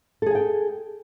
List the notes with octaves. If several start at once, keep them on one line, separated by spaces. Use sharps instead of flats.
G#4 A4 G5 G#5